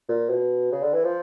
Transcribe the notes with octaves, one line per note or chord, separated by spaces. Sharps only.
A#2
B2
C#3
D3
E3
F3